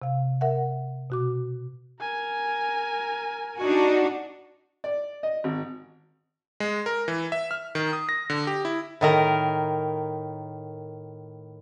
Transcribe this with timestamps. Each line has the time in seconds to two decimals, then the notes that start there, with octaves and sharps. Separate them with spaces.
0.02 C3 F5
0.41 A#4 E5 F#5
1.10 B2 F#4 D6
2.00 A#4 G#5
3.59 D4 D#4 F#4
4.84 D5
5.23 D#5
5.44 G#1
6.60 G#3
6.86 A#4
7.08 E3
7.32 E5
7.51 F6
7.75 D#3
7.93 D#6
8.09 A#6
8.30 D3
8.47 G4
8.65 E4
9.01 A2 D#3 A#4